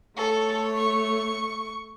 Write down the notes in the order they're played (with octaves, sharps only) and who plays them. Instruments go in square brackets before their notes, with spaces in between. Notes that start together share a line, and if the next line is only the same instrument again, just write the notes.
[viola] A3 [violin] A4 [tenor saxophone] C#5
[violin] C#6